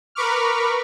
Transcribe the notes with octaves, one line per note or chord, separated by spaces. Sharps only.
A#4 B4 B5 C#6 D6 F6